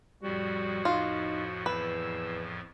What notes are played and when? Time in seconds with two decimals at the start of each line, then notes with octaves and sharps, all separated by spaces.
0.23 F2 A2 F3 G3 F#4
0.85 D#4 F4
1.66 E2 B4 E6